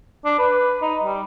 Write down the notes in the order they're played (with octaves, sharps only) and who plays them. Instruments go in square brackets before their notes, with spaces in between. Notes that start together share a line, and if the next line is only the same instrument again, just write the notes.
[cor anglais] D4
B4
D#4
G3